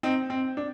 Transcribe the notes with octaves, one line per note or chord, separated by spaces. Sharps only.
C4 D#4
C4
D4